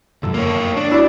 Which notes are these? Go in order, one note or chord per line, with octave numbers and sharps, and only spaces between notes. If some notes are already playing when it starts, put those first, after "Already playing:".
C#2 F#2 A4
A#3 C#5
D4
E4 F#4 D5